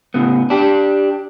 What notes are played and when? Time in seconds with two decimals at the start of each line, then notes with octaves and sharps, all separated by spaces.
0.14 A2 C#3 B3
0.50 D4 G4